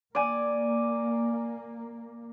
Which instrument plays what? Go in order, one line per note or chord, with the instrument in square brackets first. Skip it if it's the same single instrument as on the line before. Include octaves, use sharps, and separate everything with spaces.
[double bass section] A#3 [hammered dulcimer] D5 G#5